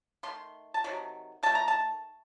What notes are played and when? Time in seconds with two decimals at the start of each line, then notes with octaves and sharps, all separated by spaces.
0.23 D#3 A3 C6
0.74 A5
0.84 C3 D#3 F#3
1.43 D#3 A3 A5
1.55 A#5
1.68 A5